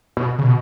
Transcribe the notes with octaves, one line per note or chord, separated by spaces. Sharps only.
B2
C#3
B2